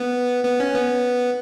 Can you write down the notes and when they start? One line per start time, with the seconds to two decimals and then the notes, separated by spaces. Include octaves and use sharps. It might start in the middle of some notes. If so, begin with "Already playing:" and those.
Already playing: B3
0.44 B3
0.60 C#4
0.75 B3